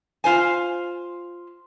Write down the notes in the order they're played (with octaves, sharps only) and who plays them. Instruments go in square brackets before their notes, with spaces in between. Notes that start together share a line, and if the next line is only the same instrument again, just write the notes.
[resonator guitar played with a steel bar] F4 C5 G#5